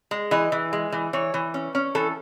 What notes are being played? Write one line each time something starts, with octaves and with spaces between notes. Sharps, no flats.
G#3
E3 D#5
E3
G#3
E3
E3 C#5
E3
C#4
C#4
E3 A4